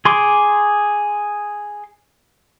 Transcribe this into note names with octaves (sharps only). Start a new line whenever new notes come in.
G#4 C6 D6